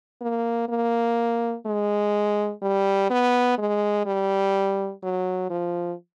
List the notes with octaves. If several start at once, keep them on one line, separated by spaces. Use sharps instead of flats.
A#3
A#3
G#3
G3
B3
G#3
G3
F#3
F3